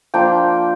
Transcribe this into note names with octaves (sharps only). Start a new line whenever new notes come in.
F3 A#3 D4 G5